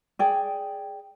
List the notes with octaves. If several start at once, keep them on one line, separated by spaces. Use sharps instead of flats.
G#4 D5 G5